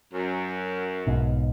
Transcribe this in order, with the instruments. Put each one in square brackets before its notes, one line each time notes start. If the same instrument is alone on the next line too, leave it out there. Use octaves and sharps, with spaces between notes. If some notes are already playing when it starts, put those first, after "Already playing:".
[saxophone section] F#2
[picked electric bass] B1 G#2 B2